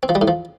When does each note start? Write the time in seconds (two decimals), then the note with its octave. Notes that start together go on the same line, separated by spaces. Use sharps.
0.03 C4
0.09 F3
0.15 G3
0.21 A2
0.28 F3